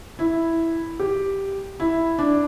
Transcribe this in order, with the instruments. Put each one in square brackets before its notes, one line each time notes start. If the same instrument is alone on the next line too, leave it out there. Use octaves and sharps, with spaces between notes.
[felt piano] E4
G4
E4
D4